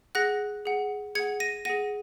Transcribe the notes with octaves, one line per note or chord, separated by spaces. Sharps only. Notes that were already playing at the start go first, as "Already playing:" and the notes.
G#4 F#5 F#6 A#6
G#4 F#5
G#4 F#5 G#6 C#7
A#6 D#7
G#4 F#5 A#6 D#7